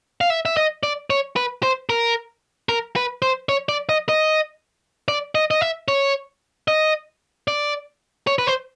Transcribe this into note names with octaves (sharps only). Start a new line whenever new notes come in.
F5
E5
E5
D#5
D5
C#5
B4
C5
A#4
A#4
B4
C5
C#5
D5
D#5
D#5
D5
D#5
D#5
E5
C#5
D#5
D5
C#5
B4
C5